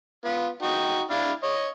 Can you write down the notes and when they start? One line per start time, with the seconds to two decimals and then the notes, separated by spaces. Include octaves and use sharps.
0.25 B3 F4
0.62 D#4 F#4 G5
1.10 D4 E4 F5
1.43 C#5 D#5